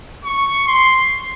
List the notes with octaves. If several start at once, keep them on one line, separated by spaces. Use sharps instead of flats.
C#6
C6